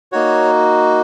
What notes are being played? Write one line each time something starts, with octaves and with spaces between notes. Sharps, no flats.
A#3 D#4 F#4 C#5